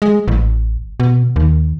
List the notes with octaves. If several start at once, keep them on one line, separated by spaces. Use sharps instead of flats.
G#3
A1
B2
D#2